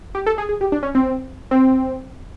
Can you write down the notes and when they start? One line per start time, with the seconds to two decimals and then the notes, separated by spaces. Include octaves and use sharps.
0.15 G4
0.26 A4
0.38 G#4
0.49 G#4
0.61 G4
0.72 D4
0.83 C#4
0.95 C4
1.51 C4